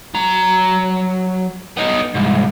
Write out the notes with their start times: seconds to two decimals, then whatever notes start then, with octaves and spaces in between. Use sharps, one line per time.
0.14 F#3 A#5
1.77 B3 D#4
2.14 C2 G#2